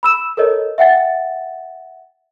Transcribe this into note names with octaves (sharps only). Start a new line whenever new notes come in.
B5 E6 E7
A4 A#4 C#5 D#5
E5 F#5 G5 A6